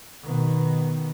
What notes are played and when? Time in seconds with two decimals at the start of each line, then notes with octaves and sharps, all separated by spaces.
0.23 B2 D#3